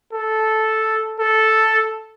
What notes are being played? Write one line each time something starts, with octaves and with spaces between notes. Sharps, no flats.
A4
A4